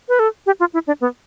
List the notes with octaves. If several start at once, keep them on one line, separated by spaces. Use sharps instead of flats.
B4
A4
G4
F4
E4
D4
B3